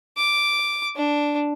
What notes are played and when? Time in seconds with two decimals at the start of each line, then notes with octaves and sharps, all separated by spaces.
0.17 D6
0.96 D4